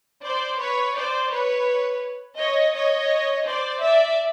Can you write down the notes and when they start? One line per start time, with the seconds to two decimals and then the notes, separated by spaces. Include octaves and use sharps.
0.23 C5 D5
0.60 B4 C#5
0.95 C5 D5
1.31 B4 C#5
2.38 C#5 D#5
2.74 C#5 D#5
3.45 C5 D5
3.81 D5 E5